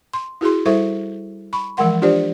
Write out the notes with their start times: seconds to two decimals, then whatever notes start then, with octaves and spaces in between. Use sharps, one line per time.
0.13 C6
0.41 E4 F#4 G#4 C6
0.66 G3 E4 A4 C5 E5 C#6
1.53 B5 C#6
1.77 E3 F3 G#3 A#4 F#5 C6
2.02 D4 F4 G4 C5 D5